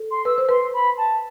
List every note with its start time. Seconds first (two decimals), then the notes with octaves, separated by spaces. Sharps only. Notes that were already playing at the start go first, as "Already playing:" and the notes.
Already playing: A4
0.10 C6
0.25 B4 E6
0.38 C5
0.49 B4 C6
0.73 B5
0.97 A5